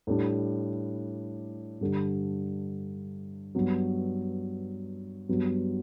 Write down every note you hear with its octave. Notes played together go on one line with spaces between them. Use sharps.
A2 G3 D4
G2 D3 G3
G2 F#3 B3
G2 F#3 B3